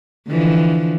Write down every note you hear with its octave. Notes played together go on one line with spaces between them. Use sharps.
D3 E3 F3